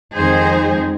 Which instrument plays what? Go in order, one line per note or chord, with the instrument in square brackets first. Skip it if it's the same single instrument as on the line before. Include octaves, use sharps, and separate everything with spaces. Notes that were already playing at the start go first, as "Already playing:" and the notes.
[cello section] F2 D#3 G#3 C4 D#4 G#4 C5